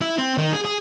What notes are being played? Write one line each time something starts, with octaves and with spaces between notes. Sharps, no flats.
E4
C4
D#3
G#4
G#4